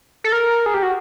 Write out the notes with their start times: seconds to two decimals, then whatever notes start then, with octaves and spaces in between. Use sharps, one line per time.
0.24 A4
0.32 A#4
0.66 G#4
0.74 G4
0.83 F#4